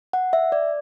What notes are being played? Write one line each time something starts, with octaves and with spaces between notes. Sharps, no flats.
F#5
E5
D5